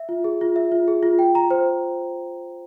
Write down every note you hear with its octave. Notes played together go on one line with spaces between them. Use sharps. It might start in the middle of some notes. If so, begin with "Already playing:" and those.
Already playing: E5
F4
G#4
F4
E5
F4
G#4
F4
G5
A#5
C5